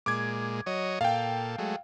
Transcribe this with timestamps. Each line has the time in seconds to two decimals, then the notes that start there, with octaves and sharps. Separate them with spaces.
0.06 A#2 G#3 D6 G#6
0.66 F#3 C#5 D#5
1.01 A#2 A4 F5 G5
1.58 F#3 G#3 A3